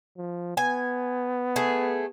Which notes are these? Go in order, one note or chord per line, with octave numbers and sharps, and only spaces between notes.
F3
B3 G#5
A3 G#4